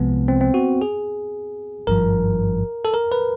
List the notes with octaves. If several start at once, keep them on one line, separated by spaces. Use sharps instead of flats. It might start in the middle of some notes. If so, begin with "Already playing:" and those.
Already playing: C2 C3 F3 G#3 B3
C4
C4
F#4
G#4
G#1 G2 D3 F3 A#4
A4
A#4
B4